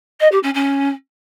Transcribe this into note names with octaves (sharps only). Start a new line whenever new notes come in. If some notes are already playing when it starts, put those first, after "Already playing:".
D#5
G4
C#4
C#4